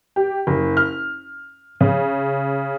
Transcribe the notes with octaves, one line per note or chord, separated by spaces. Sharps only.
G4
F#1
F6
C#3